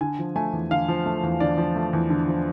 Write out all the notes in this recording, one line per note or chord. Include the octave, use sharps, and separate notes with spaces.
D3 G#5
F3
A3 G#5
E2
D3 F5
F3
A3
E2
D3 D5
F3
A3
E2
D3
F3